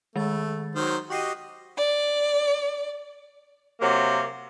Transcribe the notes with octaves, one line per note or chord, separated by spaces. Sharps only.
D#3 G#3 A3 A6
D#3 F#3 C5
F#4 G4 D#5 C#6 C7 D#7
D5
C3 F#3 A#3